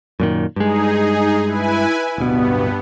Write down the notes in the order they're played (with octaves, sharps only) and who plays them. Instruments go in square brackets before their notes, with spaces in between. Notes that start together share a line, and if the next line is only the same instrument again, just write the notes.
[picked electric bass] F#2 A#2 D#3
[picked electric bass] G2 G#3 [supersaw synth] D#4 G#4
[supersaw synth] E4 B4 G#5
[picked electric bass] D1 B2 [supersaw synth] G2 B3